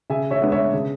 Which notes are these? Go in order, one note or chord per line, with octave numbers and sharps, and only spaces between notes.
C#3 E5 G#5
C#5 E5
G#3 B3 D4
C#5 E5
C#3